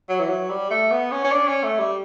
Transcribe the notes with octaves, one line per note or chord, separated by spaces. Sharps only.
F#3
E3
F#3
G3
A3
B3
C#4
C#4
D4
C#4
A3
G3